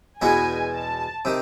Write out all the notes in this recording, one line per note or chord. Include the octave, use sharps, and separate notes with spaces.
E2 B2 G#3 B3 G#5
A5
C3 D#3